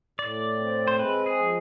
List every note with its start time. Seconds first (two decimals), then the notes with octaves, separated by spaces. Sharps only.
0.19 A2 D5
0.59 C4
0.88 C5
0.99 G#3 B4
1.26 G#4
1.39 F3